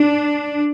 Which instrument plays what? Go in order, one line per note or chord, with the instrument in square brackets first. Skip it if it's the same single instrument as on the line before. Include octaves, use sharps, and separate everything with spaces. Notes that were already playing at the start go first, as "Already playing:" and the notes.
Already playing: [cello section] D4